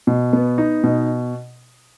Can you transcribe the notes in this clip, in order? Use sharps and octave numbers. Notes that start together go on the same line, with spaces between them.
B2
B3
D#4
B2